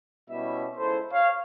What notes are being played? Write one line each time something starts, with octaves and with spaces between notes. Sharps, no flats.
B2 G3 C#4 E4 E5
C#2 E4 A4 C5
C#5 F5